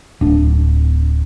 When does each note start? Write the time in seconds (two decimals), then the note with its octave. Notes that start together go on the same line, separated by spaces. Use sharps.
0.21 D1 D4